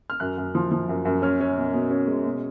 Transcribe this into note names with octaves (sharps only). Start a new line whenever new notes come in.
F6
F#2 F#6
F#2
F3
F3
F#2
F#2
C#4 F6
C#4
B2
B2
C#4
G#3
B2